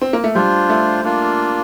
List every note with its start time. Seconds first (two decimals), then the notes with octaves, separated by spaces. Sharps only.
0.02 C4
0.13 A#3
0.24 A3
0.35 G3 D4 F4 C5
0.70 A3
1.04 A#3 D4 F4